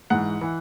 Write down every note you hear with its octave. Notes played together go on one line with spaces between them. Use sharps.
G#2 E3 F#5
E3